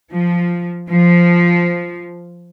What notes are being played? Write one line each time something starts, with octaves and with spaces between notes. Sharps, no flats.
F3
F3